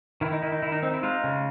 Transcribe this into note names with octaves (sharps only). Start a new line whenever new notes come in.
D#3 E4
D#4
D#3 E4
D#4
D#3 E4
D#4
C4 D#4
E4
G#3 D#4 F4
C#3